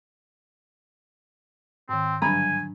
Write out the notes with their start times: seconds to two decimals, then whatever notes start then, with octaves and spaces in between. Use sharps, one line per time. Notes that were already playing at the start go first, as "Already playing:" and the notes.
1.89 G#2 D#3 C4
2.22 G2 D3 F#3 D4 G#5 A#5 B5